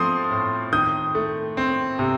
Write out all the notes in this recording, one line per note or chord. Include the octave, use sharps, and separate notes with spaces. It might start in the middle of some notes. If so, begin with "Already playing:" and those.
Already playing: F3 A3 C4 C6 D#6
A2
D#3 D#6 G6
A3
C4
C3